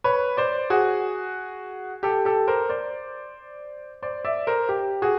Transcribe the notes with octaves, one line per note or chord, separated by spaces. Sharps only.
B4 C#5
C5 D5
F#4 G#4
G4 A4
G4 A4
A#4 C5
C5 D5
C5 D5
D5 E5
A#4 C5
G4
F#4 G#4